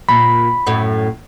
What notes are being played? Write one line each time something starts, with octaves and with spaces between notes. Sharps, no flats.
A#2 B5
F#2 A2